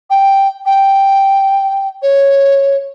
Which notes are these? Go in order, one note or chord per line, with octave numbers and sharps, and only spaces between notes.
G5
G5
C#5